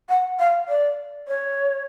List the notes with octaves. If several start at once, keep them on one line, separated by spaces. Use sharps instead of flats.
F#5
F5
D5
C#5